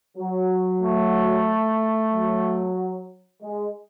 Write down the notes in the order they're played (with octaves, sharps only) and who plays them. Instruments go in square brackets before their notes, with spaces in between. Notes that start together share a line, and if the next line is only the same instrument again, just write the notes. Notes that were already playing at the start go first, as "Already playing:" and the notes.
[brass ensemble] F#3
[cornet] A3
[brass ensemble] F#3
G#3